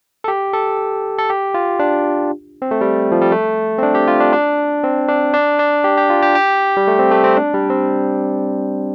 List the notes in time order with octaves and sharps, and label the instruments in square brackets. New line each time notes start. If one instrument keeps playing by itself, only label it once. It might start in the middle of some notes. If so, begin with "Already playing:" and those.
[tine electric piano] A4
G4
A4
A4
G4
F4
D4
C4
A3
G3
F3
G3
A3
C4
D4
G4
F4
D4
D4
C4
D4
D4
D4
G4
G4
F4
G4
G4
G3
A3
C4
A3
C4
D4
G3
C4